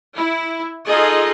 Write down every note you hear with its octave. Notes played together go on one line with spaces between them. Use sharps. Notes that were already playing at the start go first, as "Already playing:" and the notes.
E4
D#4 F4 G#4 A4 D#5